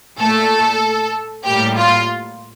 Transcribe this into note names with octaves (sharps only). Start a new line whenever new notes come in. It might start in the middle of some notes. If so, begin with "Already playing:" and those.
A#2 A3 A4
A2 G3 A#3 G4
F4